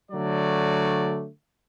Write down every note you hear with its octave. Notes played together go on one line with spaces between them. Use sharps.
D3 F#3 A3 D5